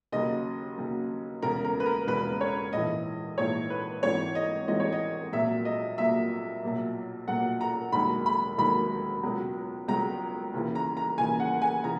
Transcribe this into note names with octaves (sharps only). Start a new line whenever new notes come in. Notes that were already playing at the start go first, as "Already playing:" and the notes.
D#2 C#3 F#3 D#5
D#2 C#3 F#3
E1 E2 C#3 A#4
A#4
B4
A#4
E1 E2 C#3 B4
C#5
A#1 G#2 E3 D#5
A#1 G#2 E3 C#5
B4
G#1 G#2 E3 C#5
D#5
G#1 G#2 E3 D#5
C#5
D#5
A#1 A#2 F#3 E5
D#5
A#1 A#2 F#3 E5
B1 A#2 F#3
B1 A#2 F#3 F#5
A#5
E1 D#2 D#3 F#3 B5
B5
E1 D#2 D#3 F#3 B5
C#2 B2 F#3
C#2 B2 F#3 A#5
D#2 C#3 E3
A#5
A#5
D#2 C#3 E3 G#5
F#5
G#5
C#3 E3 A#5